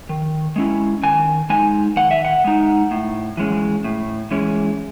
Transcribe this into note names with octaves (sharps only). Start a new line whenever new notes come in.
D#3
G#3 C#4 E4
D#3 G#5
G#3 D#4 G#5
D#3 F#5
E5
F#5
G#3 D#4
A2
E3 G#3 C#4
A2
E3 G#3 C#4